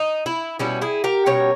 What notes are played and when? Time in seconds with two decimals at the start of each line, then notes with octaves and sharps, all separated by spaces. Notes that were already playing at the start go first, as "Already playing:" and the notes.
Already playing: D#4
0.26 E4
0.59 B2 G3 C#4 E4
0.82 E4 G#4
1.04 G4 A#4
1.26 B2 G3 C#4 A#4 C#5